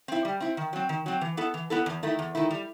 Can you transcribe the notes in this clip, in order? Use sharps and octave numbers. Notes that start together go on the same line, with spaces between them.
C4 E4
G3
C4 E4
D#3
F#3 C4
D#3
F#3 C4
E3
B3 E4 A4
E3
B3 E4 A4
E2
D#3 A3 E4
E2
D#3 A3 E4
G3